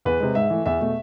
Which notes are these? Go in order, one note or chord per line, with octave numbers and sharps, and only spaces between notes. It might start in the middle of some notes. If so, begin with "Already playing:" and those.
E2 B4
C3 G#3
G#2 E5
E3 A3
E2 E5
B2 A3